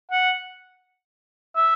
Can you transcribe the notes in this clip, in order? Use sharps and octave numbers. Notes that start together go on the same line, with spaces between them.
F#5
E5